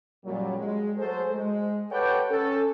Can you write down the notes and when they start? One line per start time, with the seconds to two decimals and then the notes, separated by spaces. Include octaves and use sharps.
0.24 F#2 A#2 F#3 G3
0.58 G#3
0.97 F#3 A3 G#4 A4 C5
1.30 G#3
1.91 G4 A4 B4 C#5 F#5 G5
2.30 C#4 A4